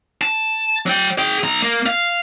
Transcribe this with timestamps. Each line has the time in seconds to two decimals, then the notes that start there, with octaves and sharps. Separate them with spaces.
0.22 A5
0.86 F#3 G5
1.18 G#4 G5
1.43 B1 A#5
1.63 A#3
1.86 F5